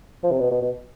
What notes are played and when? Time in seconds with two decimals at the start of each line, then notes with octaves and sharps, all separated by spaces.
0.23 F3
0.31 C3
0.40 B2
0.51 B2
0.62 B2